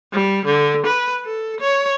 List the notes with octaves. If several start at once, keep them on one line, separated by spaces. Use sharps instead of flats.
G3
D3
B4
A4
C#5